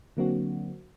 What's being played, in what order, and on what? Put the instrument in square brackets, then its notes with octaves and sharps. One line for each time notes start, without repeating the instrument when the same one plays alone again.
[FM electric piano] D3 F#3 A#3 C4 D4 F#4